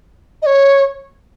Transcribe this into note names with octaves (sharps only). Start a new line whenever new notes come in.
D#5
C#5